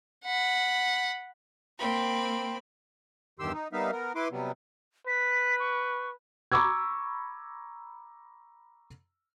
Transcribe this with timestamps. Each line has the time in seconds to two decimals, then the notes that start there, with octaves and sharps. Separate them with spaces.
0.25 F#5 B5
1.79 A#3 C4 G5 B5
3.39 E2 G2 D#3 G4 C6 E6
3.53 D#4
3.73 G3 A#3 B3 D#4 E5 F5
3.92 B3 A#4
4.15 E4 B4 C6 D6
4.31 C3 F#3 G3 B3
5.07 B4 B6
5.60 C#6
6.52 A#5 B5 C#6 D6 E6 G#6